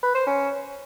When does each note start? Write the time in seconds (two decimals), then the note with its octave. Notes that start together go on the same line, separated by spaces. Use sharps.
0.03 B4
0.15 C5
0.27 C#4